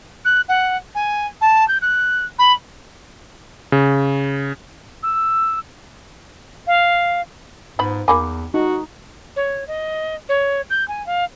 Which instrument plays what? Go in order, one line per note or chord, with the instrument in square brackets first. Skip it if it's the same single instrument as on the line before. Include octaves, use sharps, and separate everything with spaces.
[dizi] F#6
F#5
G#5
A5
G6
F#6
B5
[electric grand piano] C#3
[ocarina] E6
[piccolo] F5
[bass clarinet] G#2 [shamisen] F3 B3 B5
[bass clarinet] E2 [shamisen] D#3 A#3 G#5 [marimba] B5 D6
[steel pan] D#4 [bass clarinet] F#4
[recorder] C#5
D#5
C#5
G6
G#5
F5